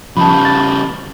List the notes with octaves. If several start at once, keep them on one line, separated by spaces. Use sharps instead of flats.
C#3 F3 G3 A5 B5
A6